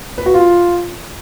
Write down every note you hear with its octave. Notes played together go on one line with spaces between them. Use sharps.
B4
F#4
F4